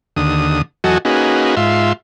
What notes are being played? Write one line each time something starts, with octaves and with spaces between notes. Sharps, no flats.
D#2 D3 D#6
E2 F#3 F#4 A4 D#5 G#5
A#3 C#4 D#4 F#4 G#4 B4
G#2 F4 E5 C6